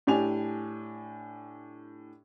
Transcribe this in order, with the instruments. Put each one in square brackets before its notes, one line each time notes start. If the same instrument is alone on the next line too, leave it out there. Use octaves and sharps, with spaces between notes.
[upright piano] A2 D4 G4 G#5 F7